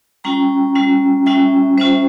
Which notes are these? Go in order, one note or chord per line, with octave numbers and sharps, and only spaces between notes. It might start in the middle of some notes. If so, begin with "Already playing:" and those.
G3 C#4 F4 G5 A#5
G3 C#4 F4
G3 C#4 F4 E5 G5
G3 C#4 F4 C5 E5